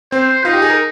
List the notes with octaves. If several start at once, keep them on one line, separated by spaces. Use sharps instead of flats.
C4 C5
D#4 F4
G4
G#4
A#4